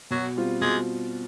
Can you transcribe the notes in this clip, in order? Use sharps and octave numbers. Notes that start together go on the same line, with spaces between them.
B2 F#3
G3 C4 F4
B2 G#3